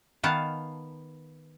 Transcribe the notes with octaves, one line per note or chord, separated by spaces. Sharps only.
D#3 B3 F5 A5